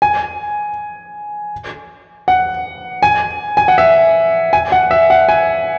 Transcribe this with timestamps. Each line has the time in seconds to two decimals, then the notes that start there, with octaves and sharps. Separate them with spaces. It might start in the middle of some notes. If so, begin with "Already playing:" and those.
0.02 G#5
2.28 F#5
3.03 G#5
3.57 G#5
3.68 F#5
3.78 E5
4.53 G#5
4.72 F#5
4.91 E5
5.10 F#5
5.29 G#5